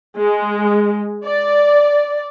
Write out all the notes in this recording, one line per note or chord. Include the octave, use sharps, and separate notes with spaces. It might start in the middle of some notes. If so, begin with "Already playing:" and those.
G#3
D5